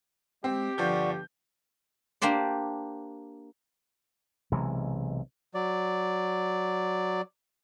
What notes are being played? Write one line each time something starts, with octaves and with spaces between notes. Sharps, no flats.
G#3 C4 G4
G1 F3 D5 F#5 C#6 G6
A#3 D4 G4 C5 D5
B1 C3 E3 G#3
F#3 D5